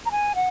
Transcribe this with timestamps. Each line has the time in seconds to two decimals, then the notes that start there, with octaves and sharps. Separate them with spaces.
0.06 A#5
0.11 G#5
0.35 F#5